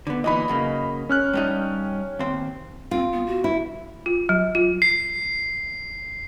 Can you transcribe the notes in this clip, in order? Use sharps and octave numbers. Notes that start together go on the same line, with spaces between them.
D3 B3
A#2 E3 D#4 D#5 B5
F#2 C#3 A#3
C#4 F6 F#6
G2 G3 D#4
D#2 C4
C4 F4
B3
F#4
E4
F4
F#3
F4
C7